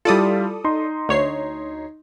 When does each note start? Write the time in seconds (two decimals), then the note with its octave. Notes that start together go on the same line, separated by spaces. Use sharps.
0.05 G3 E4 F4 A4 D5 D#6
0.64 D#4 C6
1.09 D2 C#5 C7